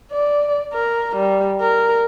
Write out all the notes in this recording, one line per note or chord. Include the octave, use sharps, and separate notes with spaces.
D5
A#4
G3
A#4